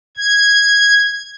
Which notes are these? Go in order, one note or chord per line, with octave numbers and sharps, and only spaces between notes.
G#6